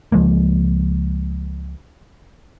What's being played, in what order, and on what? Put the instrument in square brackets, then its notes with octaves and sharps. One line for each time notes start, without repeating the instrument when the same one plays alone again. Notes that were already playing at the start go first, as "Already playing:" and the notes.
[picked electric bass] C#2 F3 G#3 A#3